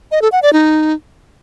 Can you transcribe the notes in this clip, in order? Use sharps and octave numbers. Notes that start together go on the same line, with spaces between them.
D#5
A4
F#5
D5
D#4